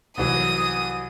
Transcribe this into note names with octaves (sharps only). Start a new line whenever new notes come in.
C2 E3 F#3 D#6